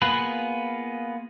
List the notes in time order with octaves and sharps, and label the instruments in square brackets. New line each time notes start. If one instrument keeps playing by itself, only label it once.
[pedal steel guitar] A#3 B3 F4 G#4 B4